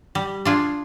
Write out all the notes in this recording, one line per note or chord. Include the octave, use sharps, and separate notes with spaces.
G3
D4 F4 G#4